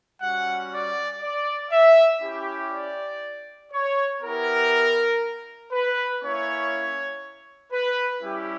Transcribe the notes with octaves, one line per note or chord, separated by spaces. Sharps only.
G3 C#4 F#4 F#5
D5
D5
E5
C#4 E4 G4
D5
C#5
B3 E4 G4 A#4
B4
A#3 C#4 E4 C#5
B4
G3 C#4 E4 G4